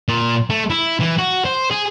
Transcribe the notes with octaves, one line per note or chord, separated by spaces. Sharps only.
A#2
A3
E4
E3
F#4
C5
G#4